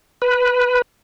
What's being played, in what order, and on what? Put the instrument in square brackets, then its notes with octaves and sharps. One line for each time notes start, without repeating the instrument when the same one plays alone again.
[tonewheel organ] B4